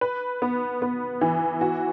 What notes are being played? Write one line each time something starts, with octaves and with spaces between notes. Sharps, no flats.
B4
B3
B3
E3
F#4